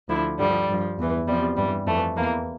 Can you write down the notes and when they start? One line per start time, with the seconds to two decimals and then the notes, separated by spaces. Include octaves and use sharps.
0.09 D2 D3 F3 E4
0.39 G2 D3 F3 G3
0.69 G2 F3
0.99 E2 E3
1.27 E2 C3 F3 G3
1.57 G2 E3 G3
1.86 F2 E3 A3
2.16 E2 E3 A#3